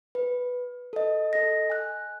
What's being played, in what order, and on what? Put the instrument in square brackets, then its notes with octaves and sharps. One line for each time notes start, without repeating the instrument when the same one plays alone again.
[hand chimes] B4
A4 D#5
A4 D#5 A#6
G#5 F#6